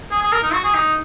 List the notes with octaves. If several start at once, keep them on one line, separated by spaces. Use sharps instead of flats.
G#4
G#4
A#4
D#4
F#4
G#4
D#4